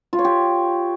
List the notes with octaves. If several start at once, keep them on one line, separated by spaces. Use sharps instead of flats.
F4
C#5
G4